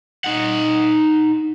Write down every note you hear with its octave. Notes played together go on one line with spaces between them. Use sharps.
D#4 F#5